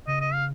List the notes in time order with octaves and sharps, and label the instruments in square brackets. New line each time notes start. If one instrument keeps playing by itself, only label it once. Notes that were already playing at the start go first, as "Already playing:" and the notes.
[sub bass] C#3 [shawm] D#5
[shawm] D#5
F5